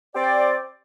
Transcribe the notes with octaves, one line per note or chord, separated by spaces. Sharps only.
C4 G4 C5 D5